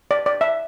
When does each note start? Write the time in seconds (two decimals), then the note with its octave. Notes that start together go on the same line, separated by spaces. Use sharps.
0.11 D5
0.26 D5
0.41 E5